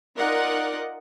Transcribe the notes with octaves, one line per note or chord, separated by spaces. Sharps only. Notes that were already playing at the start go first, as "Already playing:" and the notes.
D#4 F4 A#4 D5 D#5 F#5